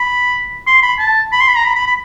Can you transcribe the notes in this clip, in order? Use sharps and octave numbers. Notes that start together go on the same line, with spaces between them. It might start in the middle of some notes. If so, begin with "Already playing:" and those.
Already playing: B5
C6
B5
A5
B5
C6
B5
A#5
B5
B5
B5